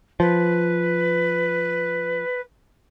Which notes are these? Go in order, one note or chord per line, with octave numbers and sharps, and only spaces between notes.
F3 B4